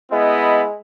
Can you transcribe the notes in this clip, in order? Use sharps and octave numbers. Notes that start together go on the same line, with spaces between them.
G#3 B3 E4 D#5